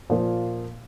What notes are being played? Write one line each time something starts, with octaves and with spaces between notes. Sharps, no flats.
A#2 F3 A#3 F4